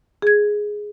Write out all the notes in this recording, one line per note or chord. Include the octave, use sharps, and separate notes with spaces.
G#4 G#6